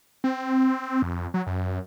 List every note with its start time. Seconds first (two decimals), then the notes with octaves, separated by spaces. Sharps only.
0.24 C4
1.02 F2
1.34 F#3
1.47 F#2